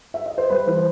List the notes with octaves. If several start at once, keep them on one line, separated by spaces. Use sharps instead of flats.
E5
D#5
C5
G3 B4
E3 C5